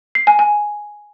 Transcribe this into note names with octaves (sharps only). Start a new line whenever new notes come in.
C7
G#5
G#5